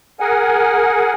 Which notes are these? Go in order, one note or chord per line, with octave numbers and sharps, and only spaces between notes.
G#4 A#4 F#5 G#5